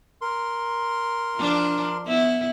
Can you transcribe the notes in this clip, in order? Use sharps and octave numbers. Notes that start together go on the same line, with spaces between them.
A#4 C6
F3 D4
B3 E4